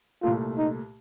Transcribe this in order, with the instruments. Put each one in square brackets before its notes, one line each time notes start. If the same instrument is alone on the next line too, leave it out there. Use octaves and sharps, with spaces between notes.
[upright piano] C2 A#2 A3 [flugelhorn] F4
[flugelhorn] D#4